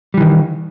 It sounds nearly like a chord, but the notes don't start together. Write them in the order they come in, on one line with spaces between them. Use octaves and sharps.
G3 E3 D#3